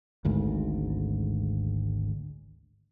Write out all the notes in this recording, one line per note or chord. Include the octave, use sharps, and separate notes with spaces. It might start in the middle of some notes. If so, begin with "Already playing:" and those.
G#1 D2 G#2